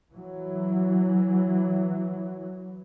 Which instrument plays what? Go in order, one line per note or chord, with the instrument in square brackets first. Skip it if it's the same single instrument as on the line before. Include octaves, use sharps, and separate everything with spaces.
[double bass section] E3 F#3